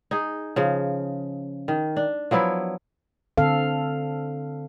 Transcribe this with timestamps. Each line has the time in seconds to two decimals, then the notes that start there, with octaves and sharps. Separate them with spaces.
0.11 D#4 G#4
0.56 C#3 F3
1.68 D#3
1.96 D4
2.31 F3 F#3 B3 E4
3.37 D3 C4 A4 F5